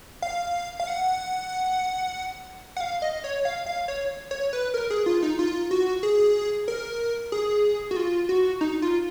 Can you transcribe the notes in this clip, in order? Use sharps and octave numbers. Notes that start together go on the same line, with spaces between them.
F5
F5
F#5
F#5
F5
D#5
C#5
F5
F5
C#5
C#5
B4
A#4
G#4
F4
D#4
F4
F#4
G#4
A#4
G#4
F#4
F4
F#4
D#4
F4